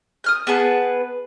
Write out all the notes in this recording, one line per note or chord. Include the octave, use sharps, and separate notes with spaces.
D#6 F6 G6
B3 G#4 B4 A5